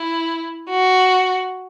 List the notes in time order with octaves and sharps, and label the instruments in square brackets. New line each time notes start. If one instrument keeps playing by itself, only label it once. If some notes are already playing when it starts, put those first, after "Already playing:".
Already playing: [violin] E4
F#4